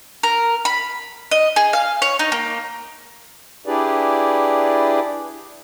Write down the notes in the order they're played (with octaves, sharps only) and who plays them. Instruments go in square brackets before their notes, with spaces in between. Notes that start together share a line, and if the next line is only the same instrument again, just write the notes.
[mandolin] A#4
B5
D#5
G#4
F5
C#5
D#4
A#3
[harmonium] D4 E4 G4 G#4 B4 D5